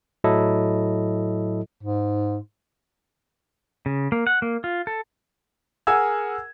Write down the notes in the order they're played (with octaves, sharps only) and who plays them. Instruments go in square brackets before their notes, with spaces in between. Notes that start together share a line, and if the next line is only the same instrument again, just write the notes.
[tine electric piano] A2 F#3 E4 A4 D#5
[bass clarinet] G#2
[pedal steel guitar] C#3
A#3
F#5
A#3
F4
A4
[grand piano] G#4 A#4 F#5 G#5 E6 G#6